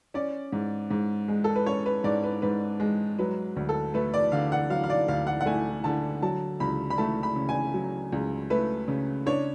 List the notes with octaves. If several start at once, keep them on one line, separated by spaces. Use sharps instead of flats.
C#4 D5
G#2
G#2
G#3
A4
B4
C#4 C#5
B4
G#2 D5
B4
G#2 B4
G#3
F#3 B4
D2
A4
A3 B4
D5
D3 F5
F#5
F#3 F5
F5
D5
D2 F5
F#5
F#5
A3 G#5
D3 A5
F#3 A5
C#2 B5
B5
A3 A5
B5
C#3
G#5
F#3
C#2
A3 B4
C#3
D4 C#5